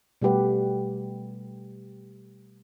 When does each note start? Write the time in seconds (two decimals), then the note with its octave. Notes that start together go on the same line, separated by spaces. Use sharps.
0.22 B2 G3 A3 G4 B4 F#5